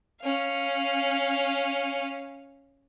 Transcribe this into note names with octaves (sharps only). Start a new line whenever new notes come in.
C#4 F5